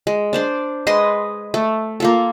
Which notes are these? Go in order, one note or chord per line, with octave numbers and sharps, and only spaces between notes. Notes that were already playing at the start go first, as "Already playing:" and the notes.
G#3
D4 C5 D5
G#3 B4 D#5 C6
A3
A#3 F4 A4